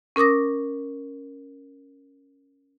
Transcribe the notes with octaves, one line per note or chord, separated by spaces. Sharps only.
C#4 A#4 D6 D#6 A#6